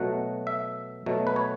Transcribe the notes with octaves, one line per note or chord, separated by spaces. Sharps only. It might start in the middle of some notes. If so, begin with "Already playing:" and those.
Already playing: B2 F#3 A3 F#5
E5
B2 F#3 A3
B4
C#5